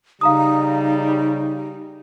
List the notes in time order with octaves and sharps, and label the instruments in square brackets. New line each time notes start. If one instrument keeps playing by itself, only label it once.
[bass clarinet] C#3 [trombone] G3 [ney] D#4 [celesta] F5 A#5 D#6